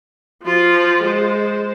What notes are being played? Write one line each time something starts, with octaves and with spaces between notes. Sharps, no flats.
F3 F4
G#3 C5